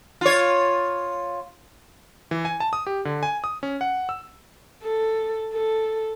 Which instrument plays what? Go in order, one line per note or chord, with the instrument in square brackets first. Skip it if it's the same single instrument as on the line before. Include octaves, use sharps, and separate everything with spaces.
[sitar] F4 C#5
[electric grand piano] E3
G#5
A5
D#6
G4
D3
G#5
D#6
C#4
F#5
E6
[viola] A4
A4